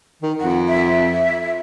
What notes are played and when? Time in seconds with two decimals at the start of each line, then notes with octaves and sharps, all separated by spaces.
0.22 D#3
0.40 F2 F#5
0.68 E5